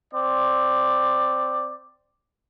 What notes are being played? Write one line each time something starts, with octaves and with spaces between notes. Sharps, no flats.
C4 D5